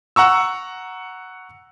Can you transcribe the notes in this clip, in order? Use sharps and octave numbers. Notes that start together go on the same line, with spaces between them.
F#5 A#5 C#6 E6